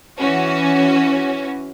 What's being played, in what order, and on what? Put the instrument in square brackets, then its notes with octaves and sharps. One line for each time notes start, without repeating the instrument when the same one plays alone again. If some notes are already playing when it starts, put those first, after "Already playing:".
[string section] E3 C#4 F#4